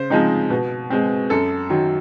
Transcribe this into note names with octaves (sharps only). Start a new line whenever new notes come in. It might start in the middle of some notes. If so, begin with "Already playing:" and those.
Already playing: C#3 C5
F3 G#3 C4 D#4
B2
G#3 C4
F#2 A4
D#3 F#3